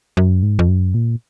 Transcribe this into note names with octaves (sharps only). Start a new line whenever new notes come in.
F#2
G#2
F2
F#2
A#2